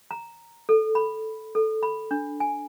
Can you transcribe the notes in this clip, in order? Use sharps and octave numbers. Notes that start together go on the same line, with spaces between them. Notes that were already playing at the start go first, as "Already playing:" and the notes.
A#5
A4
B5
A4
B5
D4
G#5